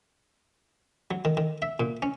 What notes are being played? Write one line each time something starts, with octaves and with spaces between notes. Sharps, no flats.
F#3
D#3
D#3
E5
A#2
C#4